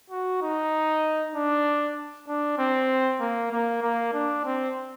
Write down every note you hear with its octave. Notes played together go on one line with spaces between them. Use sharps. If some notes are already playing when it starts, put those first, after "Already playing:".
F#4
D#4
D4
D4
C4
A#3
A#3
A#3
D4
C4